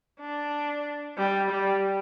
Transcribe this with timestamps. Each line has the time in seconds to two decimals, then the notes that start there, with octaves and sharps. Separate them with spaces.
0.20 D4
1.17 G3
1.51 G3